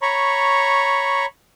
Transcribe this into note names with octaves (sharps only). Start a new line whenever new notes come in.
C#5 A#5 B5 C#6